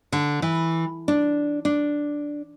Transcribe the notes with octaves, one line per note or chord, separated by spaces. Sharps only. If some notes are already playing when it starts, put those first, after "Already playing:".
D3
E3
D4
D4